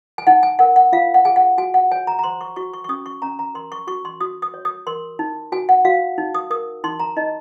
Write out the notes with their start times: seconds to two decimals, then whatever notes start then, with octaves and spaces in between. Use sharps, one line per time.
0.18 G#5
0.27 D#4 F#5
0.43 G#5
0.59 A#4 F#5
0.76 F#5
0.93 F4 F5
1.14 F#5
1.25 G#4 G#5
1.36 F#5
1.58 F#4 G#5
1.74 F#5
1.91 C#5 G#5
2.07 A#5
2.19 A#5
2.23 C5 C6
2.41 C#6
2.56 F#4 C#6
2.73 C#6
2.84 C#6
2.89 C#4 D#6
3.06 C#6
3.22 C#4 A#5
3.39 A#5
3.54 A#4 C6
3.72 C#6
3.87 F#4 C#6
4.05 C6
4.21 F#4 D#6
4.42 D#6
4.54 C#5
4.65 D#6
4.87 A#4 C6
5.19 D#4
5.52 F#4 G#5
5.69 F#5
5.85 F#4 F5
6.18 D#4
6.35 D#6
6.50 A#4 D#6
6.84 D#4 C6
7.00 A#5
7.16 D#4 D#5